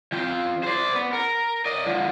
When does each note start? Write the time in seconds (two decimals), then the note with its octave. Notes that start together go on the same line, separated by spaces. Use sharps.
0.12 F3 G5
0.63 C5 D5
0.95 B3
1.13 A#4
1.65 D5 D#5
1.86 D3 F3